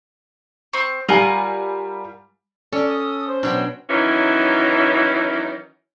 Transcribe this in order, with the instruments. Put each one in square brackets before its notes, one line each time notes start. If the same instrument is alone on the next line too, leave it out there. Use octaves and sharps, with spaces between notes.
[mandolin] C4 C#6
[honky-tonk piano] G3 G#5 [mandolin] F4 A#4 F#5
[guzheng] C#4 [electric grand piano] A4 [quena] D5
[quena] D#6
C5
[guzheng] B2 F#3 G5 [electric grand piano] D4
[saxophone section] D#3 E3 F#3 C#4 E4